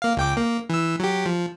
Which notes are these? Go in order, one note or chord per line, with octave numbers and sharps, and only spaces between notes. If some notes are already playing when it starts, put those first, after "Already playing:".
A#3 F5
C#2 G5 D6
A#3
E3 E6
F#3 G4
F3